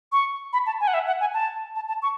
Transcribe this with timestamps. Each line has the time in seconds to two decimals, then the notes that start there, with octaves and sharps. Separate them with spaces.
0.12 C#6
0.53 B5
0.66 A5
0.80 G#5
0.88 F#5
0.94 E5
1.07 F#5
1.21 G#5
1.34 A5
1.75 A5
1.88 A5
2.02 C#6